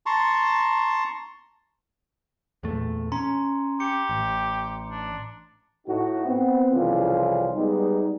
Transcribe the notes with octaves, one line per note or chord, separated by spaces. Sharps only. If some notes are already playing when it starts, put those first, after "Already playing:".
A5 A#5 C6 C#6
E2 A#2 A3
C#4 A#5 C6
G4 C#7
A1
D4
A2 D#4 F#4
B3 C4
C2 F2 C#3 E3 C#4 F4
G3 G#3 B3 D#4